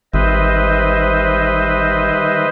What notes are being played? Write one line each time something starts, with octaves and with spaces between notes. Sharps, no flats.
G#1 D#3 G3 B4 C5 D#5 E5